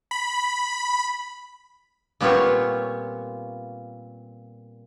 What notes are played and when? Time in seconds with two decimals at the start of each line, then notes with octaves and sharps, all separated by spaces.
0.11 B5
2.21 A#2 G3 B3 C4 F4 C#5